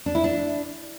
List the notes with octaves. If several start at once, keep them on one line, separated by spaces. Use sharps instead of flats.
D4
E4
D4